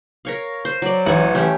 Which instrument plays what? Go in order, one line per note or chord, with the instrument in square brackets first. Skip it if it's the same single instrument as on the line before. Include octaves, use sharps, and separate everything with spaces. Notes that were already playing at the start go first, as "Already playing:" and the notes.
[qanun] A#4 C#5 F5
C5
F#3 D5
[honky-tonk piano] A1 [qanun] F#5 G#5
[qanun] A3 C#4 G4